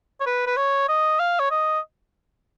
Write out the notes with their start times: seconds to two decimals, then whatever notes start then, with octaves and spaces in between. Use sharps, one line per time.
0.21 C#5
0.26 B4
0.46 B4
0.57 C#5
0.89 D#5
1.19 F5
1.40 C#5
1.51 D#5